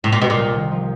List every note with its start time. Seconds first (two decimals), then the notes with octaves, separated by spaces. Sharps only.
0.04 A2 C3
0.12 A#2
0.21 C2 B2
0.30 A#2
0.37 C2
0.55 D#3
0.72 F3